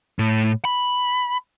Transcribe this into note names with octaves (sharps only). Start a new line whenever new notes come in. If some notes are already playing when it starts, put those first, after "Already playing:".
A2
B5